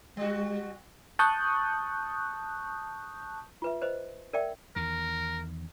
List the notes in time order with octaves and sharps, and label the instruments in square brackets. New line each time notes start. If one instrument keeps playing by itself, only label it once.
[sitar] G3 F#4 [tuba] G#3
[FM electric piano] A5 C#6 D#6 F#6 G6
[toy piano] F4 B4 E5
B4 C5 D#5
A#4 D5 E5 G5
[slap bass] E2 D#3 [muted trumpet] A#4